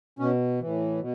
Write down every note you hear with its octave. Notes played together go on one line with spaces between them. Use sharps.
B2 C#4
A2 E3
B2